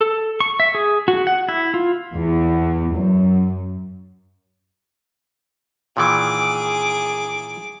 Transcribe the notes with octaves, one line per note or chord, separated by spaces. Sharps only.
A4
C#6
E5
G#4
F#4
F#5
E4
F4
E2
F#2
A#2 D#3 E3 G#4 D6